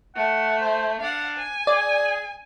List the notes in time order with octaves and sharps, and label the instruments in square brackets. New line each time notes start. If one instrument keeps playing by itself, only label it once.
[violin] A3 [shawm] F#5
[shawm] C5
[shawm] D4 [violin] F5 F#5
[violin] G#5
[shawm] G#4 [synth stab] D5